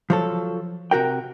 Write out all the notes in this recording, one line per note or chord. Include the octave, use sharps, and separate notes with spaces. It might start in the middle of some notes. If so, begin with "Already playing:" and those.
F3 F#3 A4
C3 F#4 A#4 G5